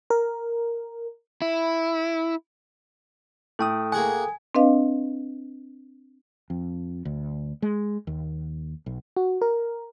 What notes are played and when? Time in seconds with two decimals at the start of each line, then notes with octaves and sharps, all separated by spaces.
0.10 A#4
1.42 E4
3.59 A2 A4 G5 D#6
3.92 A#3 G#4 F#5 G#5
4.55 C4 D4 B4 D#5 F5
6.50 F2
7.05 D2
7.62 G#3
8.07 D#2
8.86 B1
9.17 F#4
9.41 A#4